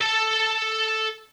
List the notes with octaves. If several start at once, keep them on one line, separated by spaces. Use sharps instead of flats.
A4 A5